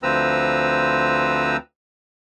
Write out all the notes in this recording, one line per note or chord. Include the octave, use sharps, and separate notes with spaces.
D2 F3 C4 B4 A#5 E6